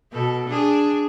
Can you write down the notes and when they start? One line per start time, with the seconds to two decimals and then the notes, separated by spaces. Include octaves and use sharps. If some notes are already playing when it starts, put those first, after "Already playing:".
0.12 B2 A4
0.49 D4 G#4